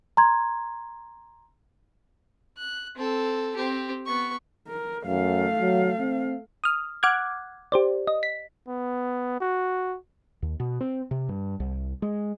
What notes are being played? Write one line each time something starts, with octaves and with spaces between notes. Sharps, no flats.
A#5 C6 G#6
F#6
C4 A4
C4 G4
B3 C#6
A#4
F#2 A3 F5
F#3
C4
D#6 F6
F#5 D6 F6 F#6 G#6
G4 C5 D5
D#5
B6
B3
F#4
D#2
B2
C4
C3
G2
C2
G#3